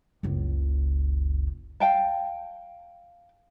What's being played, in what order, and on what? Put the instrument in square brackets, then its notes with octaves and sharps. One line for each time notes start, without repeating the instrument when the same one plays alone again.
[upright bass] F#1 C#2
[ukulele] F5 G5 A5